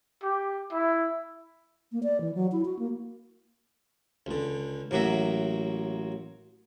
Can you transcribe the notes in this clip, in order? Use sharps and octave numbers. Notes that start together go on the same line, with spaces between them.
G4
E4
A#3
D5
E3
F#3
E4
F#4
A#3
C#2 D3
A1 F#3 A#3 F#4 E5